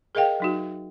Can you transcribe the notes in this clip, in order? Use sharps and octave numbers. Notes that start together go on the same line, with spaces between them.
G#4 A#4 D#5 F5 G5
F#3 D#4 F#4